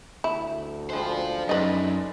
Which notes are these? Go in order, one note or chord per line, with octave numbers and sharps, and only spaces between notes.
D2 E4
D3 G3 G#3 F4 C5
F#2 D#4 B4 D5 D#5 C6